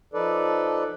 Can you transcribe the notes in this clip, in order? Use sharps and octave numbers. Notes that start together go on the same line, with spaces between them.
F3 D#4 A4 B4 D5